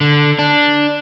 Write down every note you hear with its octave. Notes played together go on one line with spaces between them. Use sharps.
D3
D4